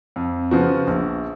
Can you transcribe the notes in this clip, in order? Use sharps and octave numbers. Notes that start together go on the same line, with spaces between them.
F2
C#3 F3 B3 F#4
A#1